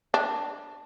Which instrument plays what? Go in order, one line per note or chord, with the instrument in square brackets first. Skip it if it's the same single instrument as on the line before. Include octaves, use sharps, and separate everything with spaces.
[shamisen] D4